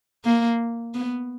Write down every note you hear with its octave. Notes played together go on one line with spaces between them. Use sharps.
A#3
B3